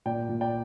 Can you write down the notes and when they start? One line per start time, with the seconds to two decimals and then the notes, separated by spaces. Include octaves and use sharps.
0.06 A#2 D5 G5
0.29 A#2
0.41 D5 G5